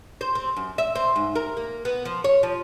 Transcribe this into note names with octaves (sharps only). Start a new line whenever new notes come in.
C5
C4
F#2
E5
C4
G#2
A#4
A#3
B3
F3
C#5
F3